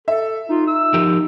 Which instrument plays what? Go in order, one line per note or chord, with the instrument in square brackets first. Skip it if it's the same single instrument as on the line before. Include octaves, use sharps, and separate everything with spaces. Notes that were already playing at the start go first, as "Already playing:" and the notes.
[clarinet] A4 [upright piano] E5
[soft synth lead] D#4 [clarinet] F4
[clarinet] E6
[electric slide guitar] F3 G4 A#4